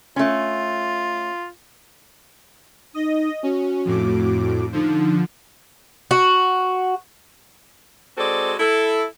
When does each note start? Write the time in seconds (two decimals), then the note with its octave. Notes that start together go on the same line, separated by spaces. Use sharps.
0.16 A3 C#4 F4
2.95 D#4 D#5
3.43 C#4 F#4
3.85 F2 A2 D6
4.72 D3 F3 D#4
6.11 F#4
8.17 G#3 C4 F#4 A4 D5
8.60 E4 A4